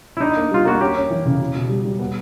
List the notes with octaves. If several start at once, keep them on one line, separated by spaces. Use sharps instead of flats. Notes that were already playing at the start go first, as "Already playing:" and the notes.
E4
D4 D#4
A#3
G3 F4
A#3 F#4
C#4 G4
C#4
E3
C#3
B2
B2
G3
G3
B3